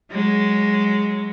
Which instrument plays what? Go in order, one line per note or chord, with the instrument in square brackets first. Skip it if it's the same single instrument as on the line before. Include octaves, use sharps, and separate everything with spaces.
[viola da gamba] F#3 G#3